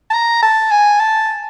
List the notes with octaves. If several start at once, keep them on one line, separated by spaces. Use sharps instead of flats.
A5
A#5
A5
G#5
A5